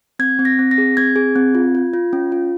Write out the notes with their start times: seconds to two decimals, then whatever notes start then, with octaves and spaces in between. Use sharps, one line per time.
0.19 C4 G#6
0.39 C4
0.45 A#6
0.59 C4
0.71 A#6
0.78 G#4
0.97 C4 G#6
1.16 G#4
1.36 C4
1.55 F4
1.75 F4
1.93 F4
2.13 C#4
2.32 F4